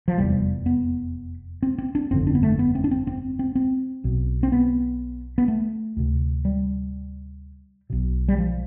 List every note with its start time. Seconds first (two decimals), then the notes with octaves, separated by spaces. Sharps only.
0.08 F3
0.17 F1 E2 C3 G3
0.66 B3
1.63 C4
1.78 C4
1.95 D4
2.11 G1 F2 D3 C4
2.27 D4
2.35 B3
2.43 A3
2.59 B3
2.75 C4
2.84 D4
2.91 C4
3.07 C4
3.39 C4
3.55 C4
4.04 B1 B2
4.43 C4
4.52 B3
5.38 B3
5.48 A3
5.97 D2 C3
6.45 G3
7.90 B1 B2
8.28 G3
8.38 F3